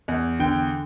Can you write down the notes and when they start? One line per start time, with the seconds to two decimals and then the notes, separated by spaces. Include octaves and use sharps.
0.08 E2
0.39 D3 G5